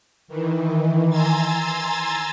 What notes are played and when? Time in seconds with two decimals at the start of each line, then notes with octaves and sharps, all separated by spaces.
0.28 D#3 E3
1.09 G#5 A#5 C6 E6 G#6 A6